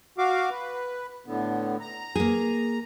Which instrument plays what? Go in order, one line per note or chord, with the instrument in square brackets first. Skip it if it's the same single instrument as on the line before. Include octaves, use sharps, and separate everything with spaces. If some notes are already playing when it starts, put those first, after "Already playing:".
[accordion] F#4 F5 D6
B4
A2 D3 B3
A#5
[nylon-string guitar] A#3 G#4